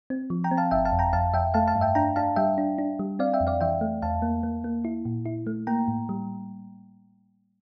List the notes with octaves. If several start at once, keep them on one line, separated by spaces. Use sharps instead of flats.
C4
F3
G5 A#5
C4
F5 A5
G1 E5 G5
F5 A5
F2
G5 A#5
F2 F5 A5
F2 E5 G5
A3 F5 A5
F5 A5
G2
E5 G5
D4 G5 A#5
D4 F5 A5
G3 E5 G5
D4
D4
G3
C4 D5 F5
E5 G5
F2
D5 F5
E3 E5 G5
A3
E2 F5 A5
A#3
A#3
A#3
E4
A#2
E4
A3
A#3 G5 A#5
A2
G3